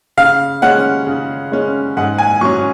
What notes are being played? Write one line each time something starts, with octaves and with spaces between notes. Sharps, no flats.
C#3 F5
G#3 C#4 F#5
C#3
G#3 C#4
G#2 F#5
G#5
F#3 C#4 C#6